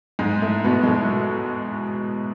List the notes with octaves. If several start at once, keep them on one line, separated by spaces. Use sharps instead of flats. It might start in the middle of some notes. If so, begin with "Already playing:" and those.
G#2 G#3
A2 A3
B2 B3
G#3
A2 A3